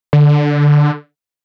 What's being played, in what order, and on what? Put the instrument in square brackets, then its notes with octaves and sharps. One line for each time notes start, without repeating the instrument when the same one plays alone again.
[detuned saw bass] D3